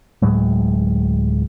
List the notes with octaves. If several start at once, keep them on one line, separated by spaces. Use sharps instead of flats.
D1 A2 F#3 G#3